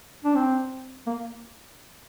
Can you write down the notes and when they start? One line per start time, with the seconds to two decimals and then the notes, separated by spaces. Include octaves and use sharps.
0.25 D4
0.35 C4
1.07 A#3